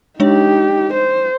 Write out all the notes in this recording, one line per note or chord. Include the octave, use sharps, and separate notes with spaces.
G#3 D4 D#4 G4 C#5
C5